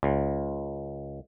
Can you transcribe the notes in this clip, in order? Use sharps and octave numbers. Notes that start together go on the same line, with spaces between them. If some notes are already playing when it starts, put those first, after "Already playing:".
C#2